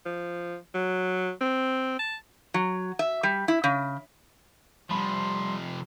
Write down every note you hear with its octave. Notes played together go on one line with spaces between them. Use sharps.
F3
F#3
C4
A5
F#3
E5
G3
E4
C#3
C3 F3 G3 B5 C6